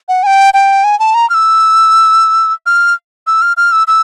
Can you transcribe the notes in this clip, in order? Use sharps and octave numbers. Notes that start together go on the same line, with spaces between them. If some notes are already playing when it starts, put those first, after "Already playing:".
F#5
G#5
G5
G5
G#5
A5
A#5
F6
E6
F6
E6
F6
F6
E6
E6